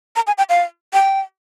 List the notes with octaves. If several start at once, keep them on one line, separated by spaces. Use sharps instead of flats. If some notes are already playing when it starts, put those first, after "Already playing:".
A#5
G#5
G5
F5
G5